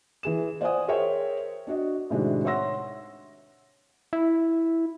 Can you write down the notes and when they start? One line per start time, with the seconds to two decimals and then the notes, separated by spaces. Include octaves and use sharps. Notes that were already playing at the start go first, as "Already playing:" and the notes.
0.23 E3 G#4 E7
0.61 C5 D5 F5 F#5 G#5 D#6
0.88 G#4 A#4 C5 C#5 E5 G5
1.67 D4 F#4 D#5
2.10 A2 C3 D#3 G#3 D4 F#4
2.45 C#5 E5 F#5 C6 E6 A#6
4.13 E4